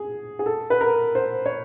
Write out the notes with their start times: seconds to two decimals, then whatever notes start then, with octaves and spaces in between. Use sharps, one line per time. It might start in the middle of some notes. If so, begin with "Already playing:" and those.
Already playing: G#4
0.39 G#4
0.46 A4
0.70 B4
0.81 A#4
1.15 C5
1.46 C#5